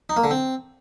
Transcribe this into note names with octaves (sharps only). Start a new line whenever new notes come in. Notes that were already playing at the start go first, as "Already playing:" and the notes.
D#4
A#3
D3
C4